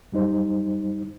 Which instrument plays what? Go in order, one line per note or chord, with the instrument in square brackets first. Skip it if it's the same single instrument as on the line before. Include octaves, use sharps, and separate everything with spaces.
[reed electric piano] F#2 G3 D#4 C5